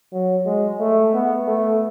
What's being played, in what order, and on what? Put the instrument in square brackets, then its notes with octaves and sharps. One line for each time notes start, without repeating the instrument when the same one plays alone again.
[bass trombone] F#3
G#3
A3
B3
A3